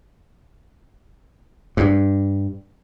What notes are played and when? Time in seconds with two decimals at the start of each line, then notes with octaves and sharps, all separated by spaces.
1.77 G2